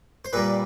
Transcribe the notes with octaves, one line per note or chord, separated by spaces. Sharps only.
C5
A#2 G3 A#3 B4